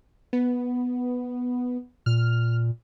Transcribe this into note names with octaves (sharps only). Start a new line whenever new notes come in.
B3
A#2 F6